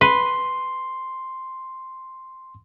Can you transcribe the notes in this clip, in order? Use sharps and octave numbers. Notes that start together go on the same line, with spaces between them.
B4 C6